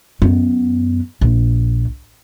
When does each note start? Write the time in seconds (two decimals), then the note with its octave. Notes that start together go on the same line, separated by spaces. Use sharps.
0.22 F#2 B3
1.21 A#1